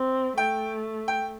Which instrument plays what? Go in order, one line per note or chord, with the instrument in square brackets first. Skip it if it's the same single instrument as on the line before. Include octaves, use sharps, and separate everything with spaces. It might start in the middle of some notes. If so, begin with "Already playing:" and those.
Already playing: [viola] C4
[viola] A3 [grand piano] G5
[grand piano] G5